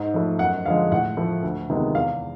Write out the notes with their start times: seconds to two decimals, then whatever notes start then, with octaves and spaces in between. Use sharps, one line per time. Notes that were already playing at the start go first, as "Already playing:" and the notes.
Already playing: G#2
0.14 F3 A3
0.39 F#2 F#5
0.65 D3 F3 G#3 F5
0.92 A2 F#5
1.17 F3 A3
1.43 D2
1.70 C3 D#3 G#3 B3
1.95 E2 F5